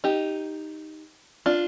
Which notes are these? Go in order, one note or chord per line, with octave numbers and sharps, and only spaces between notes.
D#4 G4
D4 F4